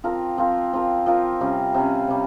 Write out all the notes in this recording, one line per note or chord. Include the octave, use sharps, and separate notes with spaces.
F3 C4 F4 A#4
F3 C4 F4 A#4
F3 C4 F4 A#4
F3 C4 F4 A#4
C3 G3 C#4
C3 G3 C#4
C3 G3 C#4